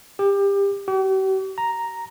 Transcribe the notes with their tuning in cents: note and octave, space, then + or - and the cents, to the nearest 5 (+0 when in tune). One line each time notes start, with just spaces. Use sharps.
G4 +25
G4 -45
A#5 +0